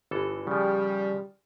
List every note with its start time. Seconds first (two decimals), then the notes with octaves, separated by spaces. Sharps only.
0.11 G1 E3 A4
0.47 C#3 F3 G3